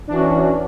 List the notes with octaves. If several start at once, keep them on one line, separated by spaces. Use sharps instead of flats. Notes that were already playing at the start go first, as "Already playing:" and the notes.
E3 C#4 D4 F#4